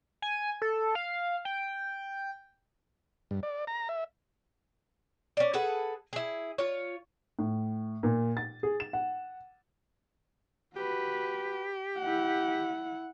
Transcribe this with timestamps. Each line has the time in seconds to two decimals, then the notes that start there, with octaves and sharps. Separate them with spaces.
0.22 G#5
0.62 A4
0.95 F5
1.45 G5
3.31 G2
3.43 D5
3.67 A#5
3.89 E5
5.37 C#4 D5
5.53 G#4 A4 B4 F#5
6.13 E4 G#4
6.58 F4 C#5
7.39 A2
8.03 A#2
8.37 A6
8.63 G#4
8.80 E7
8.93 F#5
10.76 F#4 G4 B4
11.99 E4 F#5